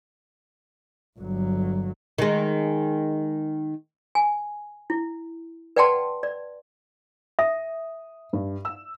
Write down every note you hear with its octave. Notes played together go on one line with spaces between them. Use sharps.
G1 F#3
D#3 G#3
G#5
E4
B4 D5 F#5 G5 A5 C6
D5
E5 D#6
G2
E6